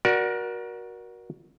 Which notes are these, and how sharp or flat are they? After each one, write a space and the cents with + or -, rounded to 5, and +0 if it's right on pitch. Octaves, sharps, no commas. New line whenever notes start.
F#4 +0 A#4 +30 D5 +0